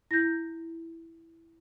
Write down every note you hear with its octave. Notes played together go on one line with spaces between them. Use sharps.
E4 G6 A#6